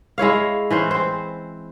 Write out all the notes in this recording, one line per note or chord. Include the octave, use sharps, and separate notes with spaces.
G#3 E4 C#5 F5
E3 C#4 C5
C4 C5